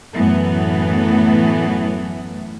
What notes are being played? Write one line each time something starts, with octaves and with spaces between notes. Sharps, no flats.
F#2 A2 E3 A3 B3